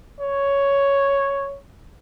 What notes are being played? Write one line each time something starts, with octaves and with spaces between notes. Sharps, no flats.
C#5